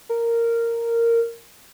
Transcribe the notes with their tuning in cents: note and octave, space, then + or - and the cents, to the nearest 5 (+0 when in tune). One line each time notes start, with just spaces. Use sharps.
A#4 -10